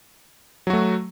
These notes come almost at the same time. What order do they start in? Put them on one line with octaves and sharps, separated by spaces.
F#3 F#4 A3